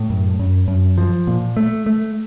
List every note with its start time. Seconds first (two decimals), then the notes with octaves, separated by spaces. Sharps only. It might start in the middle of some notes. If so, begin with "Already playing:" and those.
Already playing: A2
0.10 F#2
0.39 F#2
0.68 F#2
0.98 F3
1.27 A#2
1.57 A3
1.86 A3